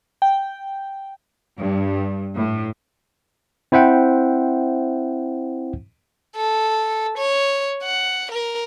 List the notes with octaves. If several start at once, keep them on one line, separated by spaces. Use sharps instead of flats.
G5
G2
A2
C4 E4 C5 E5 F#5 G5
A4
C#5
F#5
A#4